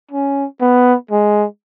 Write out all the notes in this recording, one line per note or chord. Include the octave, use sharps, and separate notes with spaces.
C#4
B3
G#3